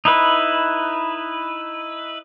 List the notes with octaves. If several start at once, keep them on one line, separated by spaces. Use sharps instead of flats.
D#4 E4 B4